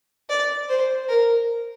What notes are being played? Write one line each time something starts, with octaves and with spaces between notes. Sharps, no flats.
D5
C5
A#4